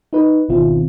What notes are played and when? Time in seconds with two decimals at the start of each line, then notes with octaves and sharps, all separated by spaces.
0.13 D#4 B4
0.49 G#1 B2 D#3 C4 E4 F4